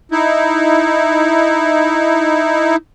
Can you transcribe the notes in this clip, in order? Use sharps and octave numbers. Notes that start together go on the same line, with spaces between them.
D#4 E4